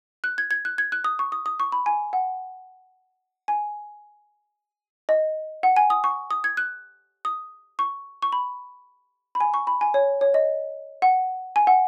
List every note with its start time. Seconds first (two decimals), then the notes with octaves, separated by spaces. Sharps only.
0.24 F#6
0.38 G#6
0.51 G#6
0.65 F#6
0.78 G#6
0.92 F#6
1.04 D#6
1.19 C#6
1.32 D#6
1.46 D#6
1.60 C#6
1.72 B5
1.86 G#5
2.13 F#5
3.48 G#5
5.09 D#5
5.63 F#5
5.76 G#5
5.90 D#6
6.04 C#6
6.31 D#6
6.44 G#6
6.57 F#6
7.25 D#6
7.79 C#6
8.22 C#6
8.32 B5
9.35 B5
9.40 G#5
9.54 C#6
9.67 B5
9.81 G#5
9.94 C#5
10.21 C#5
10.34 D#5
11.02 F#5
11.56 G#5
11.67 F#5